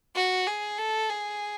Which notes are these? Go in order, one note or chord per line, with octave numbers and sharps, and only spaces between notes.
F#4
G#4
A4
G#4